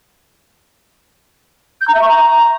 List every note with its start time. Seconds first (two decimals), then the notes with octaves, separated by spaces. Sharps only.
1.81 G6
1.88 A#5
1.95 E5
2.02 C#6
2.08 A#5